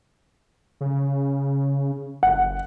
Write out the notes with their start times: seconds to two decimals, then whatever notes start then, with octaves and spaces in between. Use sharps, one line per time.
0.81 C#3
2.23 F#1 F#5